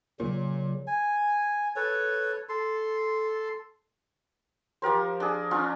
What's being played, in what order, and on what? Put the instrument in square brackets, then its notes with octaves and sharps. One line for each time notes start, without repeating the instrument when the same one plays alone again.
[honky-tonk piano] A#2 [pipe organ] C#3 F#3
[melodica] G#5
A4 B4 C#5
A4 C6
[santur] F3 G4 A#4 C5
D4 G#4
C#4 D4 F4